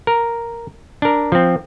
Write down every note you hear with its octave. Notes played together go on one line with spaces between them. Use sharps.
A#4
D4 A#4
F3 C4